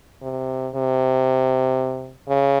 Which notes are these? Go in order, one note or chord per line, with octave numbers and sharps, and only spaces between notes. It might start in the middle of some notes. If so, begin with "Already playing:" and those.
C3
C3
C#3